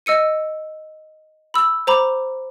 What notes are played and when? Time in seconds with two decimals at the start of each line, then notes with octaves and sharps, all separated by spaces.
0.06 D#5 E6 C#7 D#7
1.54 B5 E6
1.87 C5 A#5 B5 D6